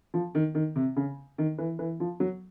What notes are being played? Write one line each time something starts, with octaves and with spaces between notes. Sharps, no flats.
F3
D#3
D#3
C3
C#3
D#3
E3
E3
F3
F#3